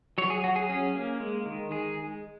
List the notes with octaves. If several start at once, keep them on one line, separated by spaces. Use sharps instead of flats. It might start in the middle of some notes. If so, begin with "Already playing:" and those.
F#3 C#5
G#4
F#3 F#4
G#4
C#4 G#4
A#3
G#3
D#3
G#3 G#4